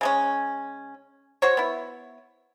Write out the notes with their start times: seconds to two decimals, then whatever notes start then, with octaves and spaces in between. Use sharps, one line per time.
0.01 C#3 G#3 C#4
1.42 F#4 C5 C#5
1.57 B3 E4